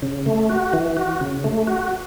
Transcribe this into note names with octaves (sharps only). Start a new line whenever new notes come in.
C#3
A3
F#4
E3
F#4
C#3
A3
F#4